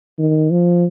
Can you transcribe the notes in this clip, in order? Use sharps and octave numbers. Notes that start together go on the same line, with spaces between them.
D#3
F3